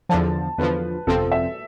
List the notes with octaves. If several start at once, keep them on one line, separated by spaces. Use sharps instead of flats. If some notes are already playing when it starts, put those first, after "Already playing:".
E2 D3 F3 A5
E2 D3 F3 B4
G1 F2 C3 F3 C4 A4
E5